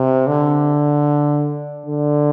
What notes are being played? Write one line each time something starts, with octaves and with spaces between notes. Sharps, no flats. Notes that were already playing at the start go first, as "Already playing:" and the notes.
Already playing: C3
D3
D3